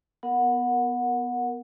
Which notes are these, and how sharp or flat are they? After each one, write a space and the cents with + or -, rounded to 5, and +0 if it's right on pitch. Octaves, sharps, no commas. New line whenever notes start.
B3 +0 A#4 +0 F#5 -20